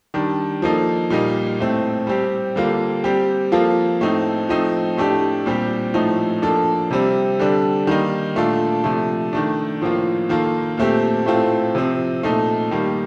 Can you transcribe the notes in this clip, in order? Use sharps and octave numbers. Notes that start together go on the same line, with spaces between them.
D#3 G3 D4
F3 A#3 D#4 A4
A#2 G3 A#3 D#4
A2 A3 C4
G3 C4 G4
D3 G3 A#3 D4 F4
G3 C4 G4
F3 A#3 F4 A4
A2 A3 C4 D#4
F3 A3 C4 D#4
A2 A3 D4 G4
A#2 G3 C4 G4
A2 F3 A3 D#4 A4
F3 A#3 D4 A4
C3 G3 C4
D3 G3 D4
D#3 G3 A#3 D#4
A#2 A3 D4 F4 A4
C3 F3 A3
D#3 A3 D4
A2 F3 A#3 F4
D#3 A#3 F4 A4
A#2 A3 C4 G4
A2 A3 C4 F4 A4
C3 F3 C4
A#2 A3 D#4 A4
D#3 G3 A#3